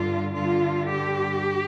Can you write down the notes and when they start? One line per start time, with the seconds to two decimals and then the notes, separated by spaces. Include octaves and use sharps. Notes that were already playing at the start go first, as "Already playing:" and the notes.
Already playing: G2 D3 F4
0.34 G2 D3 F4
0.88 G4